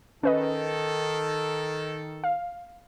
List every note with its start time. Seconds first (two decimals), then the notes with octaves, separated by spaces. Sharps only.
0.23 D#3 C#4 A4 B4 D#5
2.24 F5